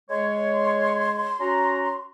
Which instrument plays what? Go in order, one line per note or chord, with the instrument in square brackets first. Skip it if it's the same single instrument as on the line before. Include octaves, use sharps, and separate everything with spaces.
[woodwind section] G#3 C#5 [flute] C6
[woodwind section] C#4 F#4 A#5